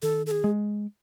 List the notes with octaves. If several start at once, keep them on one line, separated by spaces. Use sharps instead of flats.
D#3 A4
A4
G#4
G#3